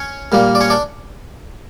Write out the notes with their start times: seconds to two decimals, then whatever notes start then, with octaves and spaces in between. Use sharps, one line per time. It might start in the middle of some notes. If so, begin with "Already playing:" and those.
Already playing: C#4 C#5
0.32 A#2 G3 A#3
0.55 D5
0.61 C#4 C#5
0.70 D4 D5